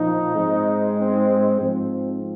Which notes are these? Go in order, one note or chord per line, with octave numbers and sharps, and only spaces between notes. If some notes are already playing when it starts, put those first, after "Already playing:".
Already playing: A#2 F3 D#4
G#2 G#3 C4
C4
G#2 F3 C4